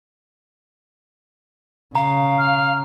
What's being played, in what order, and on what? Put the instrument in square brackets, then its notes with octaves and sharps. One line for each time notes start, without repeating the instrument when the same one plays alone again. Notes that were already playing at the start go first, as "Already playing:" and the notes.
[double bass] C#3 [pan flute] F5 [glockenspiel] A#5
[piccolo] F6